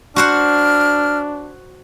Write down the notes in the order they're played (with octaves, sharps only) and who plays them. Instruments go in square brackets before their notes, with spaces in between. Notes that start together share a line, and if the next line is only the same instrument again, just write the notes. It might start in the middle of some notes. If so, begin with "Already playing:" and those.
[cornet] D4 [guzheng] F#4 C5 F#5 [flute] F6